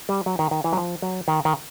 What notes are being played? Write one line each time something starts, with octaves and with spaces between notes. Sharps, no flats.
G3
F#3
D#3
D#3
E3
F#3
F3
F#3
D#3
D#3